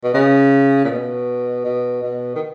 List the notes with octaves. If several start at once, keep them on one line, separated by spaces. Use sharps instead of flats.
B2
C#3
A#2
B2
B2
B2
D#3